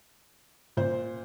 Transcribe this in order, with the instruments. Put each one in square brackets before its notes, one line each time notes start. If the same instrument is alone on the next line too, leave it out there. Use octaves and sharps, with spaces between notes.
[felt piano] A#2 C5